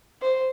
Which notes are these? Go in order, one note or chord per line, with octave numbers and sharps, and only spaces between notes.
C5